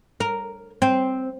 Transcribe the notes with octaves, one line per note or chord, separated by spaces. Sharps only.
A#4
C4